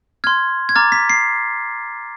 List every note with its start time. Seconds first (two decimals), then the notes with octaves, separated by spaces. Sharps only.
0.24 C6 F6 G#6
0.69 G#6
0.76 A#5 D6 F6 A6
0.92 B6
1.10 C7